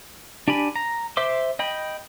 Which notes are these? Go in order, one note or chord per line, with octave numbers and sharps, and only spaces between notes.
D4 G4 G#5 B5
A#5
C5 E5 C6 D6
D#5 G5 B5